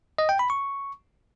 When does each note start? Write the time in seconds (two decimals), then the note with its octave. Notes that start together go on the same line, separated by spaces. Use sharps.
0.18 D#5
0.29 G5
0.39 B5
0.50 C#6